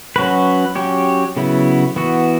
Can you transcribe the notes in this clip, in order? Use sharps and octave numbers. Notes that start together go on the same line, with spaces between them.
F#3 C#4 F#4 B4
F#3 C#4 G4 C#5
C#3 F#3 B3 E4
E3 B3 F#4